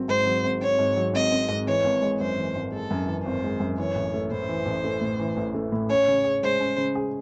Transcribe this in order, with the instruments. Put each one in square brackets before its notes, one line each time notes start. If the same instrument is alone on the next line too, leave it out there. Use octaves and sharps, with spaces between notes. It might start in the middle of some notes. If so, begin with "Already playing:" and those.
Already playing: [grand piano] G#1 F#3 C4
[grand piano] G#2 [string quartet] C5
[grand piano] F#3
G#1
[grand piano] C4 [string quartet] C#5
[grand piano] G#2
F#3
[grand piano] G#1 [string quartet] D#5
[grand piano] C4
G#2
[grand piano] E3 [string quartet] C#5
[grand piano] G#1
G#3
[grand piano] F#2 [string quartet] C5
[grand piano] E3
G#1
[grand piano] G#3 [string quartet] A4
[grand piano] F#2
E3
[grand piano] G#1 [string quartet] C5
[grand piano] G#3
F#2
[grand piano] E3 [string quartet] C#5
[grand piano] A1
A3
[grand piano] A2 [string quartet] C5
[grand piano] E3
A1
A3
A2
E3
A1
A3
A2
[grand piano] C#4 [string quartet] C#5
[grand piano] C#3
G#4
[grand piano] G#3 [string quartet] C5
[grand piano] C#4
C#3
G#4